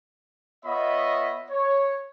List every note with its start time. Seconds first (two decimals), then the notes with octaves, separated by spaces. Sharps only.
0.65 B3 F4 C#5 D#5 E5 B5
1.50 C#5